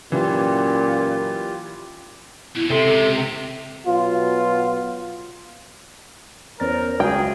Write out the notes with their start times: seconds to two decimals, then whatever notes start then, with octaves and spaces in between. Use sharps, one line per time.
0.12 F#2 A#2 E3 F4 G4
2.56 B2 D3 E4
2.70 C#2 C3 A4 C6
3.87 B2 F#3 F4
6.60 E2 C#4 A#4 C5 A6
7.00 C#2 F#3 F#4 G#4 E5 G5